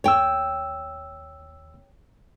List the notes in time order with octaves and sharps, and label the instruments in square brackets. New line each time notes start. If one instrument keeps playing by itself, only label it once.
[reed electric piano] D#2 E6 [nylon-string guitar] C#5 G5